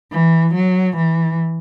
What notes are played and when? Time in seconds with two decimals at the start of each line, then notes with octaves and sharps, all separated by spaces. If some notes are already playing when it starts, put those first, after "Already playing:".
0.12 E3
0.55 F#3
0.97 E3